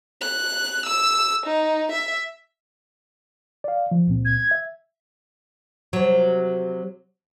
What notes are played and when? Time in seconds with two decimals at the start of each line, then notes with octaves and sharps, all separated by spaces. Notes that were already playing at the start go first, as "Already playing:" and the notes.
0.21 F#6
0.86 E6
1.46 D#4
1.92 E5
3.64 D5 F5
3.91 F3
4.07 C#2 A#2 C4
4.25 G#6
4.51 E5
5.93 C3 F#3